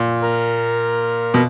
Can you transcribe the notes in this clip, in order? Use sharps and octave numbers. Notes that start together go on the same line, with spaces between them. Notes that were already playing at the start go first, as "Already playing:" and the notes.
Already playing: A#2
A#4
B2